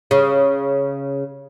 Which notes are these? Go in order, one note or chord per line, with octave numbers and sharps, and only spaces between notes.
C#3